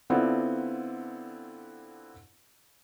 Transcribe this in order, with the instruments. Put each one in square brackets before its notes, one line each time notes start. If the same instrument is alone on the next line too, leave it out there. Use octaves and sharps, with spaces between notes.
[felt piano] D3 B3 C4 D4 E4 F4